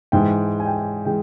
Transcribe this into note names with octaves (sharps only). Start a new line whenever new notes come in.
G#2 E3 G#3 G5
G#5
G5
G#5
E3 G#3 G5